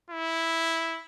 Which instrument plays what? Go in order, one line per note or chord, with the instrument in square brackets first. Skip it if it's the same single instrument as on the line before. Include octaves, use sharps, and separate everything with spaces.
[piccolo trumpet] E4